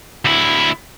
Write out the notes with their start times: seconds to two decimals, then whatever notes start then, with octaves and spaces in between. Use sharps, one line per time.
0.25 D2 E4